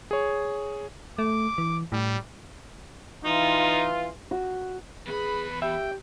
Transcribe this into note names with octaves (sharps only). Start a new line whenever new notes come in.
G#4 C#5
A3 D6
E3
A2 G3
E3 D#4 F4
F#4
E2 G#4 B4 B5
G4 E5 G5